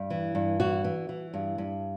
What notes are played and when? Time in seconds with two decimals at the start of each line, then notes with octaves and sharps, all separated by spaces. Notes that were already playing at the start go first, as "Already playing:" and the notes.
Already playing: G2
0.10 E3
0.35 G2
0.60 E3 F#4
0.84 E3
1.09 E3
1.34 G2
1.58 G2